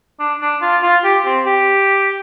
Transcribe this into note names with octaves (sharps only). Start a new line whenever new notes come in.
D4
D4
F4
F4
G4
C4
G4